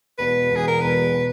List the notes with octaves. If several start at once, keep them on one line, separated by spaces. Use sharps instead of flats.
E1 E2 B2 B4
E1 E2 B2
G#4
A#4
E1 E2 B2 B4
B2